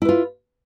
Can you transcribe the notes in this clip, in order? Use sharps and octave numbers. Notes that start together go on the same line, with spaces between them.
E4 F4 B4